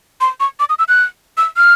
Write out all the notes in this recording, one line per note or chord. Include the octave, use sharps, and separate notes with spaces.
C6
C#6
D6
D#6
E6
F#6
E6
F6